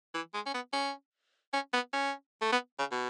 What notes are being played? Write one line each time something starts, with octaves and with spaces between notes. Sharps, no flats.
E3
G#3
C#4
B3
C#4
C#4
B3
C#4
A3
B3
C#3
B2